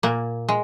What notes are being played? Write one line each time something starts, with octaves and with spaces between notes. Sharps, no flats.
A#2 A#3
G#3